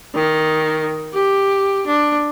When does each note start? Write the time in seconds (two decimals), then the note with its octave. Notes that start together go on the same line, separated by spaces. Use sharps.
0.15 D#3
1.14 G4
1.87 D4